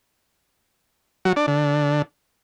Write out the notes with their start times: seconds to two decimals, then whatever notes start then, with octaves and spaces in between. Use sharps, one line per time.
1.25 F#3
1.36 D4
1.48 D3